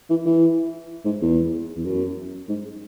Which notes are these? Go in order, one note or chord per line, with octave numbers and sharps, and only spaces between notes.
E3
E3
G#2
E2
E2
F#2
G#2